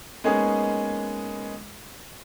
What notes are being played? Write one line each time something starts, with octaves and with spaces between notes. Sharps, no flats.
G#3 A#3 B3 C#4 D#4 G#4